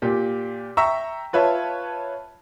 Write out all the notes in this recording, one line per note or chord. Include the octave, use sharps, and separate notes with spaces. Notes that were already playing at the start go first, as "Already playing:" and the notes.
A#2 G4
E5 G5 A#5 C#6 E6
F4 B4 C#5 E5 A5